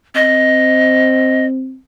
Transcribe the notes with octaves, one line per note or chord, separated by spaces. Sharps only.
C4 D#5